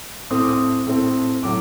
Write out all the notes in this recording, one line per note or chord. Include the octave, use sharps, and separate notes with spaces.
A2 A3 C4 D#6
D6
D#6
A2 A3 C4
A2 F#3 D6